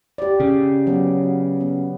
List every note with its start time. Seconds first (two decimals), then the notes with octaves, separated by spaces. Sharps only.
0.18 G4 D5
0.40 C#3
0.87 F#3 B3
1.60 B3